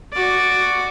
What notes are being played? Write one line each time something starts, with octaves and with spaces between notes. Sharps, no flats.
F#4 D5